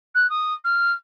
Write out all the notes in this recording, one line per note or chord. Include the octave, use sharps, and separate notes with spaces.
F#6
D#6
F6